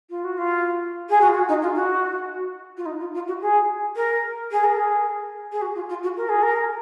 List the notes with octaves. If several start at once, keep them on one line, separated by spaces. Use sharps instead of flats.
F4
F#4
F4
G#4
F#4
F4
F#4
D#4
F4
F#4
F4
D#4
F4
F4
F#4
G#4
A#4
G#4
A#4
G#4
G#4
F#4
F4
F4
F#4
A#4
G#4
A#4